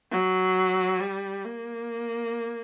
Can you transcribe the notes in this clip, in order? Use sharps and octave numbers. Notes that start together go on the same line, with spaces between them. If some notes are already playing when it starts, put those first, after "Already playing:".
F#3
G3
A#3